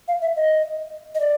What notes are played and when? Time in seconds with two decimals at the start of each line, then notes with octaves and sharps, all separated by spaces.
0.08 F5
0.22 E5
0.36 D#5
1.15 D#5
1.20 D5